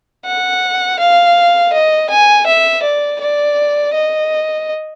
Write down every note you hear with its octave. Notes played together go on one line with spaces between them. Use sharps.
F#5
F5
D#5
G#5
E5
D5
D5
D#5